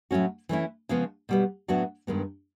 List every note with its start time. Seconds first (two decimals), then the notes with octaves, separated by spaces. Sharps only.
0.11 A2 F#3 A3 C#4 F#4
0.49 E3 A3 C#4 E4
0.89 C#3 F3 G#3 B3
1.29 B2 G3 B3
1.68 A2 F#3 B3 D4 F#4
2.07 G2 D#3 G#3 B3